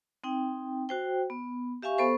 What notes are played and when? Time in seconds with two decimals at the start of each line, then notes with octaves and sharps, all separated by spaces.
0.24 C4 D#4 G5
0.89 F#4 C5 G5
1.30 B3
1.83 G4 E5 F5 G#5 C#6
1.98 B3 A4 C5 C#6